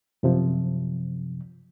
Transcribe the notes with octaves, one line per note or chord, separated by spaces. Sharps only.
F#2 C3 F3